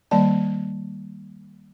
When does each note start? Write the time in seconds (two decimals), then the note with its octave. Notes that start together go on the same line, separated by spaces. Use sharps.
0.11 D#3 G3 A#3 D5 A5